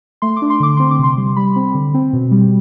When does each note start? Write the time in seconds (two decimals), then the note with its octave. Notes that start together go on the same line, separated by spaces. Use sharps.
0.22 A3 C6
0.36 D6
0.42 D4
0.50 C6
0.60 D3 D6
0.77 C4 C6
0.91 D6
0.99 C3 C6
1.17 G3
1.36 G3 B5
1.56 C4
1.75 D3
1.94 C4
2.13 B2
2.31 G3